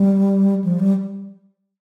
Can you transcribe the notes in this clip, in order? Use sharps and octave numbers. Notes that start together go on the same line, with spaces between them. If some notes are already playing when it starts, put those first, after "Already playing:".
Already playing: G3
F3
G3